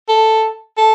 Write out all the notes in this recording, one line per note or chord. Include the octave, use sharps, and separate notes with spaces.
A4
A4